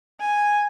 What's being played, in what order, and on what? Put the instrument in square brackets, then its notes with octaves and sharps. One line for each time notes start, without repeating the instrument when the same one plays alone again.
[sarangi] G#5